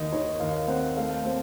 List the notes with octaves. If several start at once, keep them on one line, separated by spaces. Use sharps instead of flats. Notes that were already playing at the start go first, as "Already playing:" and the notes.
Already playing: D#2 D#5
D#3 C#5
D#2 F5
C4 F#5
A3 F5
C4